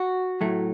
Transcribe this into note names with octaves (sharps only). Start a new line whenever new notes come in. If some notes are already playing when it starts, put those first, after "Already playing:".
Already playing: F#4
A2 F#3 A3